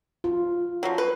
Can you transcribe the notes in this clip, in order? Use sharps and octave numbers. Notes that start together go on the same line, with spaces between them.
F4
F3 F#3
B4